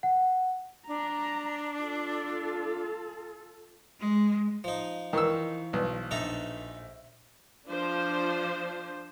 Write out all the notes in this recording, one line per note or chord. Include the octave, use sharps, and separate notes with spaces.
F#5
D4 A#5
F4 A4
G#3
F3 D#4
D#3 E3 C#6 E6
B1
A#1 D#4 A4 E5 A#5
F3 D4 C5